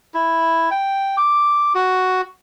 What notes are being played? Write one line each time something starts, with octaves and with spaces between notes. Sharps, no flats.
E4
G5
D6
F#4